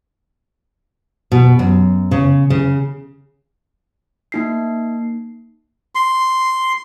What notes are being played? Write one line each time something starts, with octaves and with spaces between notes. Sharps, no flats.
B2
F#2
C#3
C#3
A#3 D#4 C7
C6